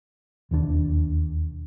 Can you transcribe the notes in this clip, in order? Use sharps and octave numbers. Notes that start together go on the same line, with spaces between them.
E1 D#2 D#3 D4